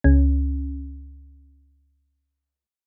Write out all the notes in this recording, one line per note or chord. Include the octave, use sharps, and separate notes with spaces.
C#2 C#4